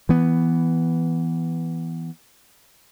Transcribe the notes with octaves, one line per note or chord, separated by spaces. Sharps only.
E3 B3